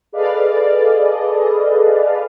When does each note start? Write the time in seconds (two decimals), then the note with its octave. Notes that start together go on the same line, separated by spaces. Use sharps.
0.12 G#4 A4 B4 D5 D#5 F5